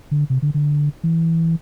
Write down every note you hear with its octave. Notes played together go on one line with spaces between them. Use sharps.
D3
C3
D3
D3
E3